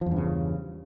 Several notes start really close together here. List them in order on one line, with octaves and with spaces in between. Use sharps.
F3 E2 G2 C#3